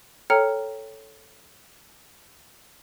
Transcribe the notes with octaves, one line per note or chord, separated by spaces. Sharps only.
A4 C#5 G5 A#5 F6 C#7